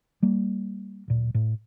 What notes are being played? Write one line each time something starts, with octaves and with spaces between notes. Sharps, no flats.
G3 A#3
D1 A#2
A2